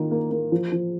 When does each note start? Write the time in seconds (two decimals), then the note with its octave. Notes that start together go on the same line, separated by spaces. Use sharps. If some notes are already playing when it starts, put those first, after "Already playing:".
Already playing: D#3 A#3 F4
0.11 A#3
0.31 A#3
0.52 F3
0.72 F3